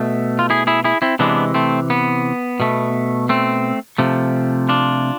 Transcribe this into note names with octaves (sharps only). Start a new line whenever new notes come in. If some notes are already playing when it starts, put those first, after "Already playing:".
Already playing: B2 A3
F4
E4 G#4
E4 G#4
E4 G#4
C4 E4
C3 E3 G#3 B3 D4
A3 C4
B3
B2 A3
A3 C4
C3 F3 A3
D4 F4